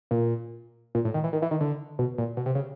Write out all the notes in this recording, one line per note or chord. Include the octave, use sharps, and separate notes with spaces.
A#2
A#2
A2
D#3
E3
D#3
E3
D#3
D3
B2
A#2
B2
C3
C#3